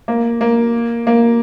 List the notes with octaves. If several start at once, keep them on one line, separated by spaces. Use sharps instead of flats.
A#3
A#3
A#3